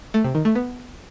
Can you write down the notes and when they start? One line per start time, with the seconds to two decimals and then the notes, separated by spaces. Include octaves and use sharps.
0.14 A3
0.24 C3
0.35 D#3
0.45 A3
0.55 B3